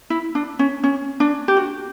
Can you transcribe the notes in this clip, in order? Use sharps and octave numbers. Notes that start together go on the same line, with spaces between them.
E4
D4
C#4
C#4
D4
G4
F#4